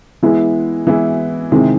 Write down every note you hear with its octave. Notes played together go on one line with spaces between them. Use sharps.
E3 G#3 B3 E4
E3 G#3 B3 E4
C3 D#3 G#3 C4 E4